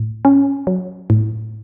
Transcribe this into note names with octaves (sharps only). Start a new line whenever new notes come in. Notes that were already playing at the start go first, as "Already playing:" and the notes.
Already playing: A2
C#4
F#3
A2